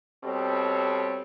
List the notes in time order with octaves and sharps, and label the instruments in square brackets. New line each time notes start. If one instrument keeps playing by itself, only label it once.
[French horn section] B2 G3 C4 G4 A4 C#5